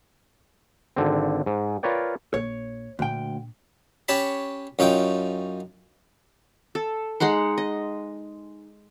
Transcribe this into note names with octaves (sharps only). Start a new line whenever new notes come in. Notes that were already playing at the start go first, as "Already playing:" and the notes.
G#1 D3 C4
G#2
F4 A#4 B4 C#5 D5 G5
A#1 C#5
D2 A#2 D4 G5
C#4 G4 C#5 A5 B5
F#2 C#4 D#4 F4 G5
A4
G#3 D#4 F#5 C6
D#5